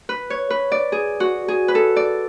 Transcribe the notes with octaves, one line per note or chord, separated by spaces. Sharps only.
B4
C#5
B4
D5
G#4
F#4
G#4
B4
A4
D5